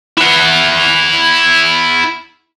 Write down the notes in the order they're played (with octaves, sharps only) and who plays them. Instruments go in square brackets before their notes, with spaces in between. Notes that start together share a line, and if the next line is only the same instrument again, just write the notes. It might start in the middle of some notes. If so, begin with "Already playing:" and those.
[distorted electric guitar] E4 F#5